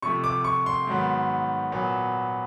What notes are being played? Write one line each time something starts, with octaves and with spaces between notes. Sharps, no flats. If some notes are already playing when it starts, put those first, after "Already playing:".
C3 F3 A3 C#6
D6
C#6
C6
G#2 D#3 F#3 B3
A#2 F#3 B3